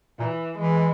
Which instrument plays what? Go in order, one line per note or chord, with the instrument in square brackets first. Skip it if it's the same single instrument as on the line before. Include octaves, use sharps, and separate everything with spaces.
[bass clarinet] A#2 [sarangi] E3
[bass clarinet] E3 [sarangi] G#3